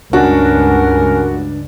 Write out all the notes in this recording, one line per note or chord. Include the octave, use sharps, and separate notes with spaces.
C#2 G2 C#4 D4 F#4 A#4